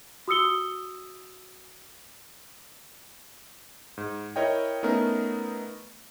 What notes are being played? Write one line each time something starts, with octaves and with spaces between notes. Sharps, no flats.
F#4 D#6 E6 C#7 G7
G#2
E4 A#4 C#5 D#5 G5
A3 B3 C#4 D#4 A#4